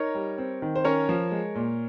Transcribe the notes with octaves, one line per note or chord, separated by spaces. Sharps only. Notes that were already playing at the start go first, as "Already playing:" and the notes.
Already playing: D#4 A#4 C#5
G3
C4
D#3
C5
C#4 A#4 C#5
F3
G#3
A#2